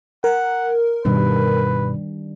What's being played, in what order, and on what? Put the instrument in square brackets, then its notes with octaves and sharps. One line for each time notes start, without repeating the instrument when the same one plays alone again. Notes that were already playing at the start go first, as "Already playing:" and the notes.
[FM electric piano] A#4 [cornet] F#5
[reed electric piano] G2 B2 [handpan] D#3 G3 D4 [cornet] B4